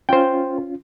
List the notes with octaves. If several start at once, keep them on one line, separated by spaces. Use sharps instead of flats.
C#4 F4 C5 G5